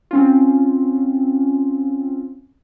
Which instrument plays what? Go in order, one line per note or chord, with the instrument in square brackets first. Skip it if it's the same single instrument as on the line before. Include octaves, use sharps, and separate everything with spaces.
[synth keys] C4 C#4 F4